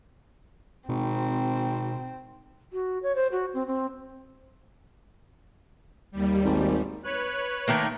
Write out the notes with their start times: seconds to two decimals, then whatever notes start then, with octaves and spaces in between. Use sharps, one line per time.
0.89 G#1 B2 C4
2.73 F#4
3.03 C#5
3.15 C5
3.32 F#4
3.54 C4
3.67 C4
6.12 D#2 G3
6.45 G#1
7.04 B4 C#5 F#6
7.68 D#3 A3 A#3